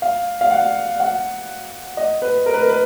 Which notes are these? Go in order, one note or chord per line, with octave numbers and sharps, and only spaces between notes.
F5
F5
F#5
F#5
D#5
B4
A#4
B4
A#4
B4